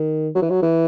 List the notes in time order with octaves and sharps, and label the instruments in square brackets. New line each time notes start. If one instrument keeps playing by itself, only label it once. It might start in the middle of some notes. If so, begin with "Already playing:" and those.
Already playing: [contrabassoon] D#3
F#3
E3
F#3
E3